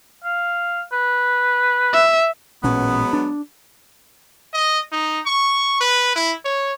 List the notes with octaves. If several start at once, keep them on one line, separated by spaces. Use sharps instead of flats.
F5
B4
E5
A1 A#2 F#3 G#3 B3 C#4
D4
D#5
D#4
C#6
B4
E4
C#5